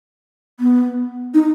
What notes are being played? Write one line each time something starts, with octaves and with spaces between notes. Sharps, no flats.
B3
D#4